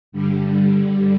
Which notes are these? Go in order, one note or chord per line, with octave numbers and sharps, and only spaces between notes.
G2 D3 G3